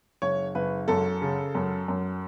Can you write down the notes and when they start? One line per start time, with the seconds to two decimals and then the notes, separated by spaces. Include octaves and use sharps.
0.22 F#1 C#5
0.55 F#1 B4
0.88 F#2 A4
1.22 C#3
1.55 F#2
1.88 F#2